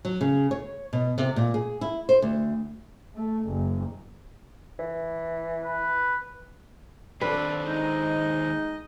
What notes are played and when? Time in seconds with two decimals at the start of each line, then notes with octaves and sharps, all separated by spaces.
0.05 F#3
0.21 C#3
0.51 C#5
0.93 B2
1.18 C3
1.36 A#2
1.54 G#4
1.81 E4
2.09 C5
2.22 D2
3.15 A3
3.46 F#1
4.79 E3
5.64 B4
7.21 D#2 C4 D4 A4 B4
7.64 G#3 D#4 D#5